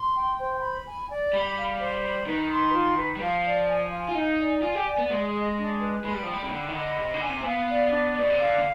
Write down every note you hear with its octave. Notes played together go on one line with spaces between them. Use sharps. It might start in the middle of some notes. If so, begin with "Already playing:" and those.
Already playing: C6
G5
C5
B5
G#5
D5
G3 B5
F5
C5
B5
D#3 B4
C6
F4
B4
G3
F3 F5
D5
G#5
F5
F4
D#4 G#5
D5
F4 G#5
G4
D5
B3
G#3 G#4
D#5
D4
B4
G#3 B5
G3
F3 G5
G3
C3
D3 B5
D#3
D3 D#5
C3 B5
D3
G#5
C3
C4
B3 F5
D5
D4
B2 D5
C3
D3 F5
D3